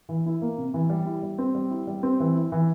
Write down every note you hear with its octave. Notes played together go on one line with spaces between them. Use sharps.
E3
E4
A#3
C3
E3
G3
E4
G3
C4
G3
E4
G3
C4
E3
E4
E3